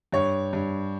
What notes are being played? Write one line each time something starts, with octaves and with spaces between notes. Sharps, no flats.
G2 C#5
G2